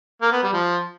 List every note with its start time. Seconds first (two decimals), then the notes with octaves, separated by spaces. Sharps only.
0.22 A#3
0.32 B3
0.42 G3
0.53 F3